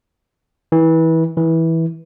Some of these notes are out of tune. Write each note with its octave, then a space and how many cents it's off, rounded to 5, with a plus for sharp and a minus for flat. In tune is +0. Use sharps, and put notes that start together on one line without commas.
E3 -25
E3 -15